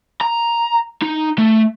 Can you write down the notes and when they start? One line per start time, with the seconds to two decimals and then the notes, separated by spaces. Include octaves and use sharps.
0.21 A#5
1.02 D#4
1.38 A3